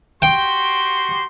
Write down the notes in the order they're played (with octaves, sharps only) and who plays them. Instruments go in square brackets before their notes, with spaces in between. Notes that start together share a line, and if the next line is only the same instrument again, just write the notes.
[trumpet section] F#4 G4 C6 [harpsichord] G5